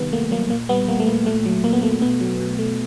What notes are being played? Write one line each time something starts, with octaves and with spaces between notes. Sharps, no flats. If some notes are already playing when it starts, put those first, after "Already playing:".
Already playing: C3 D#3 G3 B3
A3 A#3
F#3 A#3
A#2 A#3
G3 B3
G3 A#3
A3
A#2 A#3
A#2 A3
F#3
A#2 A#3
B3
A3 A#3
B2 B3
F#3
B2
A3